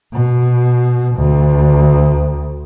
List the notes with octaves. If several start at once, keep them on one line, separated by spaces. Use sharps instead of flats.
B2
D2